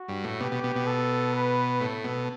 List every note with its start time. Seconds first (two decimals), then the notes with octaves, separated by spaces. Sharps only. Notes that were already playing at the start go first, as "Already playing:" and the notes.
Already playing: F#4
0.09 G2
0.24 A2
0.40 B2 G4
0.52 B2
0.64 B2
0.76 B2
0.87 A4
1.34 B4
1.81 A2 A4
2.04 B2